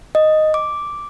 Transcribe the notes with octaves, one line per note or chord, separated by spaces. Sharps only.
D#5
D6